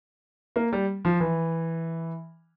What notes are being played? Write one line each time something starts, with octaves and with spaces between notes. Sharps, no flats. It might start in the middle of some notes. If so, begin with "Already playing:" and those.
A#3
G3
F3
E3